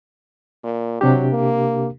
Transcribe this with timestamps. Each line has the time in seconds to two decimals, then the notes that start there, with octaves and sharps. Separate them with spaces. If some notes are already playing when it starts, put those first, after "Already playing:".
0.63 A#2
1.01 C3 F#3 D4 G4
1.31 A#3